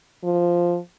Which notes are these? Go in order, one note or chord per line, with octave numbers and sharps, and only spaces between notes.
F3